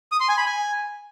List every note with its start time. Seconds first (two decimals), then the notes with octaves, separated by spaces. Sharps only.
0.12 D#6
0.20 C6
0.29 G#5
0.37 B5
0.46 G#5